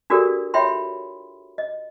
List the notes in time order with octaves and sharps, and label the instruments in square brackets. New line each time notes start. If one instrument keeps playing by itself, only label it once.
[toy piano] D4 F#4 G4 A4 A#4 D5
F4 C#5 E5 G5 B5 C6
D#5